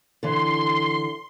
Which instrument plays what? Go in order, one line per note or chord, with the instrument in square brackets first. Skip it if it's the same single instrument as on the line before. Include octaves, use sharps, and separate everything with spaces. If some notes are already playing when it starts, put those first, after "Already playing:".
[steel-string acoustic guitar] D3 E3 [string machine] C6